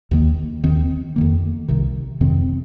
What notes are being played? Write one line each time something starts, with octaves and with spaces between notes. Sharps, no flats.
D#2 D#3 A#3
D#2 D#3 C4
F2 D#3 A#3
C2 C3 D#3
F2 C3 D#3 C4